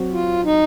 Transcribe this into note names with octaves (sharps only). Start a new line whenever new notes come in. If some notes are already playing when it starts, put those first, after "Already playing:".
Already playing: F#3 C4 F#4
F4
D#4